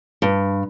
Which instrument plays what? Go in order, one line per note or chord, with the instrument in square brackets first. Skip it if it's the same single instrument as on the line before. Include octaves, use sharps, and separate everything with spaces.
[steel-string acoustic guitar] G2